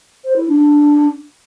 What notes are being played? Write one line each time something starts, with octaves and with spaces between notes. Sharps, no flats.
C5
E4
D4